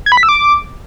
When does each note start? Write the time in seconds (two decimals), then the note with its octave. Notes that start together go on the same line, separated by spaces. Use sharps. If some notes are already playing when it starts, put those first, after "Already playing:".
0.06 G#6
0.12 B5
0.17 B6
0.23 E6
0.29 D6